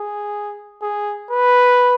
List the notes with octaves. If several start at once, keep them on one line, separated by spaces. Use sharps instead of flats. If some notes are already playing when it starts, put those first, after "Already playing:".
Already playing: G#4
G#4
B4